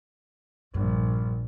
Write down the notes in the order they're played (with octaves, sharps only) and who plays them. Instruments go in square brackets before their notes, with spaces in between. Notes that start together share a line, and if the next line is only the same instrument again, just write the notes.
[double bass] A#1 [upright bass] G2